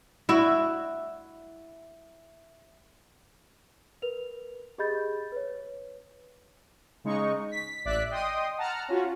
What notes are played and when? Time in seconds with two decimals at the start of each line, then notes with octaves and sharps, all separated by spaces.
0.29 E4 F#4
4.02 A#4 B4 F7
4.78 G4 G#4 D#5 B5 G6 A6
5.32 B4 C#5
7.04 C#3 G#3 D#4 C#6
7.51 B6
7.85 A1 D5 E5 F#6 B6
8.10 D#5 G5 C6 D#6
8.58 F#5 A5 A#5 F6
8.88 C#4 F4 F#4